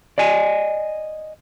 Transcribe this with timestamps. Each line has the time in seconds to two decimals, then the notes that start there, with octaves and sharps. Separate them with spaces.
0.18 D5 D#5 G#5